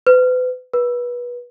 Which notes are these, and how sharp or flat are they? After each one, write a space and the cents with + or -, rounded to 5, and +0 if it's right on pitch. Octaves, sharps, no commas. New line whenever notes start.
B4 +40
B4 -25